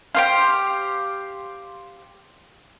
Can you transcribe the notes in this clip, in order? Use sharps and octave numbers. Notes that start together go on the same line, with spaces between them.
G4 C5 F5